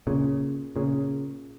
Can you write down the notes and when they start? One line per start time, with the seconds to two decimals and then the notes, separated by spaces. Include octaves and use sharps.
0.07 A#2 C#3
0.76 A#2 C#3